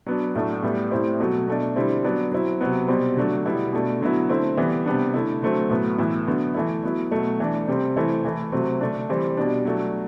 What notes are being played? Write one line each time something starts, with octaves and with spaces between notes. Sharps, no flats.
F#3 B3 D4
A2 F#3 A3 D4
A2 G3 B3
A2 G3 C4 E4
B2 F#3 A3
B2 A3 D4
D3 G3 C4 E4
F#3 B3 D4
F#3 C4 E4
C3 F#3 B3
B2 G3 C4
D3 F#3 A3 D4
B2 G3 B3 E4
B2 A3 D4
D3 F#3 B3 E4
D3 A3 C4 E4
E3 G3 B3
C3 G3 B3 D4
D3 A3 E4
D3 F#3 A3 C4
A2 F#3 B3
A2 E3 B3 E4
D3 F#3 B3
E3 A3 E4
F#3 B3 E4
B2 F#3 A3
E3 A3 D4
C3 G3 C4
E3 A3 C4 E4
E3 A3 E4
C3 F#3 A3 C4
D3 A3 D4
E3 G3 C4 E4
B2 G3 D4
F#3 A3 D4